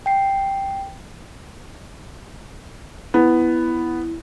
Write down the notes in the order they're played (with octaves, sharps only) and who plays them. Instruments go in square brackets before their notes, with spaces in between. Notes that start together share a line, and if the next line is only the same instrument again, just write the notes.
[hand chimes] G5 C7
[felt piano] B3 [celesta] E4